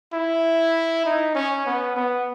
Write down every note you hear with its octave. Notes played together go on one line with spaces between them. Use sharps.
E4
D#4
C#4
B3
B3